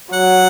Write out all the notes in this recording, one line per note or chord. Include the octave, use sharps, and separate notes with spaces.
F#3 F#5